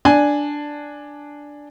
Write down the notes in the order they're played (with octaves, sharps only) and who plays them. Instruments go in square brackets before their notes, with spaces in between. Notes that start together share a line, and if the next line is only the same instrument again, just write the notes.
[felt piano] D4 G#5